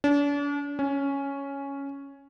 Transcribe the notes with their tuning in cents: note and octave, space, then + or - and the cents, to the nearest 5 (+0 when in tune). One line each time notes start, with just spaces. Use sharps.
D4 -40
C#4 +0